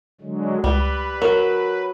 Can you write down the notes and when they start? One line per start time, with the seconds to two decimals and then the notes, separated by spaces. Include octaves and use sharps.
0.21 D3 F#3 G#3
0.64 C#2 G3 B4
1.22 F#3 A#4